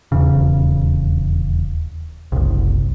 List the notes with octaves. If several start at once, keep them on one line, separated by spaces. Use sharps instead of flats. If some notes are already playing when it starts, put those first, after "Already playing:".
D#1 E2 C#3
F#1 C2